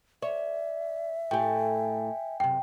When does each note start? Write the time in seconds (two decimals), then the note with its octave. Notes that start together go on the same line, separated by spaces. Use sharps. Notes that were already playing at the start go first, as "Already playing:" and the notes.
0.22 C#5 D5 E5
1.31 A2 G4 G5 G#5
2.40 F#2 C3 G5